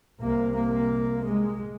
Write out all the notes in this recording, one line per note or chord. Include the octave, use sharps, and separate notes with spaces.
C2 C3 A#3
A#3
G#3